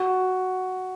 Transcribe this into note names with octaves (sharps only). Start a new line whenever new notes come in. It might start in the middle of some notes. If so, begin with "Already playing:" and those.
Already playing: F#4